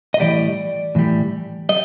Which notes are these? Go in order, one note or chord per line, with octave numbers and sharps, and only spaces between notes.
D#5
A2 E3 G3 D5
A2 E3 G3
G3 D#5